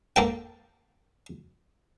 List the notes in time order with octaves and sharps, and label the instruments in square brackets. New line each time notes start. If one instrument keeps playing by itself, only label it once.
[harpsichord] A#3 A4 G5